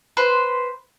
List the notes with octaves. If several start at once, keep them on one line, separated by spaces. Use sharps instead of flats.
B4 C5 C6